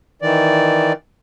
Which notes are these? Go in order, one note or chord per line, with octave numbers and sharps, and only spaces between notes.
D#3 E3 D5